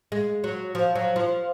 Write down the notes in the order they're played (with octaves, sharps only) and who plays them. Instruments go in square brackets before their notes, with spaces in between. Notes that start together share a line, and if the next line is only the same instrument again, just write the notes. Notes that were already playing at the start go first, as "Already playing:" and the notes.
[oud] G#3
F#3
F3
F#3
F3